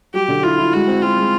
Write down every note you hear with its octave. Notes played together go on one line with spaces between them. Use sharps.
F#3 G4
D3
E4 F4
E4
G#3 F#4
C4
C4 F4
G#3